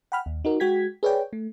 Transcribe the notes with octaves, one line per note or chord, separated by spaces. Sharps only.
F#5 G5 B5 F6
D#2
D#4 F#4 A#4
G#3 F#4 G5 G#6 B6
G#4 B4 C#5 D5 G5
A3